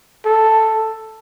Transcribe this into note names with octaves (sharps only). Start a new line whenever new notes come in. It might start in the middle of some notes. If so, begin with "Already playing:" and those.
A4